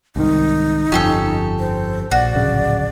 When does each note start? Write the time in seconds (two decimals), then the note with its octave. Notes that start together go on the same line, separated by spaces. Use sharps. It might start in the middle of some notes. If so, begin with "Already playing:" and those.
0.16 C2 G#2 D#3 D#4
0.92 G1 F2 F3 C#4 G4 A4
1.60 C5
2.11 A#1 F#4 D5
2.35 D1 A#1 C#3